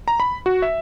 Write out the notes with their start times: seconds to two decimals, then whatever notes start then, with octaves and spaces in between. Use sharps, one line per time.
0.08 A#5
0.20 B5
0.46 F#4
0.62 E5